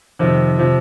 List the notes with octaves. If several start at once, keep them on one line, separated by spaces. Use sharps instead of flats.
F2 C3 D#3
C3 F3